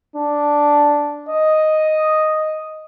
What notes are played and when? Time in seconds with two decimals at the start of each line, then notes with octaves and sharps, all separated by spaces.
0.16 D4
1.29 D#5